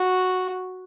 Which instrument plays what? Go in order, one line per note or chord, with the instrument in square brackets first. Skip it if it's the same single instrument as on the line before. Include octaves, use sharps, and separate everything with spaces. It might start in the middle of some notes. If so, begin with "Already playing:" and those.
Already playing: [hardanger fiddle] F#4